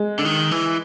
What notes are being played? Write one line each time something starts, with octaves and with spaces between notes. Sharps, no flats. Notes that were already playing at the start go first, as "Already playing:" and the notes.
Already playing: G#3
D3
D#3
E3